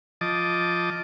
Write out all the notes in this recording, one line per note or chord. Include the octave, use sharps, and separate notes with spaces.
F3 D#5 A5 D6